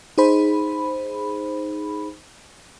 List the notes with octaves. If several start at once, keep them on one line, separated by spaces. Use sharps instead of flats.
D#4 G#4 C5 B5